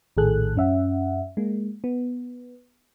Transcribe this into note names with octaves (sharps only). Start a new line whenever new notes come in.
A#1 A2 D#3 G#4 A4 F#6
F#2 C#4 E5 F#5
G#3 A#3
B3